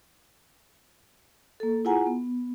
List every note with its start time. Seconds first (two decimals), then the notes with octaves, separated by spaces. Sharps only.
1.60 A#3 A4
1.85 E4 F4 G#4 F#5 G#5 A#5
2.06 B3